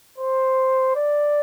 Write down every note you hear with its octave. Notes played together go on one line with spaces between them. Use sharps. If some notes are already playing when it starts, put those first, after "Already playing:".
C5
D5